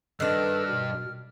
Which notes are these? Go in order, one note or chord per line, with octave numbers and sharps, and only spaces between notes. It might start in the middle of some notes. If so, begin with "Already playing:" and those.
G2 D#3 D4 A4 B4 F6
B2